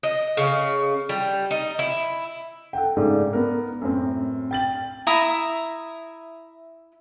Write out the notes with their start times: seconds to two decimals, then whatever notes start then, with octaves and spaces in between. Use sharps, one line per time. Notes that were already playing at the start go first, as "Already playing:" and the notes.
0.03 D#5
0.37 C#3
1.09 G3
1.51 D#4
1.79 E4
2.73 A4 F#5 G5
2.97 G#2 C#3 A3 D4
3.33 B3 A#4
3.81 F#2 A2 C4
4.51 G5 A6 F#7
5.07 E4 E5 A#5 D#6